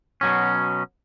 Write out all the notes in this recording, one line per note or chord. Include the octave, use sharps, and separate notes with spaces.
B2 F#3 C#4